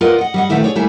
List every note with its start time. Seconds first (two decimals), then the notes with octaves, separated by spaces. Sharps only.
0.01 F4 A#4 B4 D5 D#5 F#5
0.19 D#5 F#5
0.34 G3 D#5 F#5
0.49 A#2 D#3 E3 A3 E4 G4
0.62 G#4 C#5 D5
0.75 D2 G3 A3 A#3 E4 G#5